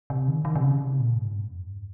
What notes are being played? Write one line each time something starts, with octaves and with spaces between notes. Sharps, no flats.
C3
D#3
D#3
C3
C#3
C3
A#2
G#2
G2
F2
G2